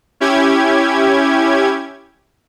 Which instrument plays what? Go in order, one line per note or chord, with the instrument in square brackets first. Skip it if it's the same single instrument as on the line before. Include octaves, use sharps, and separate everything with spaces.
[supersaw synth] C#4 E4 G4 G#6